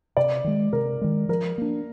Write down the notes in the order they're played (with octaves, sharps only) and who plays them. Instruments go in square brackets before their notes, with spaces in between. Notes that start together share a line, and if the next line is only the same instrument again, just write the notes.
[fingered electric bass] C3 [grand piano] D5
[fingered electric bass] D#3 G#3
[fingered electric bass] C3 [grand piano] A#4
[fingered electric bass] D#3 G#3
[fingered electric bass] F3 [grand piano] A#4
[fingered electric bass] A#3 D4